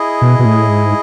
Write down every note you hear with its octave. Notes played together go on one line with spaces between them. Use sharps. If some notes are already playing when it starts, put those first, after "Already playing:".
Already playing: E4 G#4 D#5
B2
B2
A2
G#2